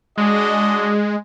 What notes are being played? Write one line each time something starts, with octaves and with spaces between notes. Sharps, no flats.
G#3 D4 F#4 D#5